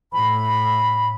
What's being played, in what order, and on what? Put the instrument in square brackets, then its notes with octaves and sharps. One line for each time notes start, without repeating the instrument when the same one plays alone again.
[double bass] A2 [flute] B5